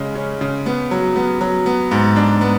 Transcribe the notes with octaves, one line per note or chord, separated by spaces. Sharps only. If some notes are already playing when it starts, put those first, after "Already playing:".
Already playing: C#3 G#3
C#4
C#3
B3
F#3
B3
F#3
B3
G#2
D4
B3